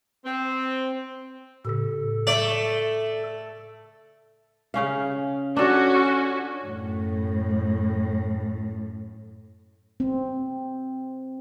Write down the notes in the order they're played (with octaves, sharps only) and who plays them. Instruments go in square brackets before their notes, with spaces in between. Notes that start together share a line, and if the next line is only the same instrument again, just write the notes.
[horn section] C4
[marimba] A2 C#3 E6 [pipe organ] A4
[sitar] A3 [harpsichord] D5
[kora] C#3 C#4 F5
[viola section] C#4 F#4 [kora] D4 A4
[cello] F#2 A2
[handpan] C4